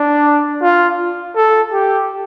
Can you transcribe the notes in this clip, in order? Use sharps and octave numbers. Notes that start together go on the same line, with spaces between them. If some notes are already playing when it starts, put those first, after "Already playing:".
Already playing: D4
F4
A4
G4